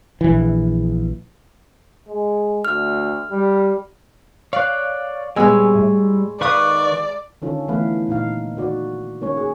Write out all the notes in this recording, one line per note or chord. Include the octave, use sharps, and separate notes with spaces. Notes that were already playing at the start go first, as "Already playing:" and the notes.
A#1 E3
G#3
D2 F6
G3
C#5 D5 F5 F#6
A#2 G3 G#3 B3 C#5 G#5 E6
A2
D#3 B4 D5 F5 C#6 D#6 F#6
D3 D#3 C#4 F4 A4
E3 A3 B3 E4 B4 F5
A#2 D#4 F5
D#3 F#4 D5
D#3 A#3 C#4 C#5
G#4